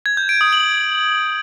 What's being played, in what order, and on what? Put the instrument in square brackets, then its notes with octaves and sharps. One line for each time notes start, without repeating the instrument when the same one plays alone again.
[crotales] G#6
G6
D7
D#6
F#7